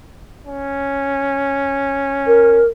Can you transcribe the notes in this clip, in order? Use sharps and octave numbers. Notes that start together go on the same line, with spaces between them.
C#4
A#4